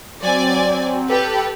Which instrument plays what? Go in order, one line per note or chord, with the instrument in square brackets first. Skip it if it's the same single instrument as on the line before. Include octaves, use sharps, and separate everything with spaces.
[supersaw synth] F#3 C4 [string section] D5 G#5
[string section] G4 B4 [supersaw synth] A4